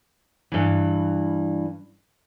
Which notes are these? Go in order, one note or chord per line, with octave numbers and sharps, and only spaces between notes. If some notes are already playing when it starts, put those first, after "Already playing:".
G2 E3